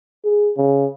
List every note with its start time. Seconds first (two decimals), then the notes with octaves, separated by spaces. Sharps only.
0.24 G#4
0.57 C#3